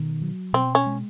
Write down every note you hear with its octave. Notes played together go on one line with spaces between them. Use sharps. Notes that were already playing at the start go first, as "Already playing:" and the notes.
Already playing: B2 D#3
F#3
B2 C4
C#4
G#3